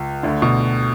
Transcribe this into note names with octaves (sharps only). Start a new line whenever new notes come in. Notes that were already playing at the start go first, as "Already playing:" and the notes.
Already playing: C#2
D2 D3
B2